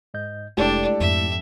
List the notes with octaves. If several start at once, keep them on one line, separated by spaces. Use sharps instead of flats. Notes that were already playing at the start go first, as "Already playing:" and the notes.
G#2 D#5 G6
F1 G#3 A3 D4 E4 G4 A4 D5
F2 G#2 E5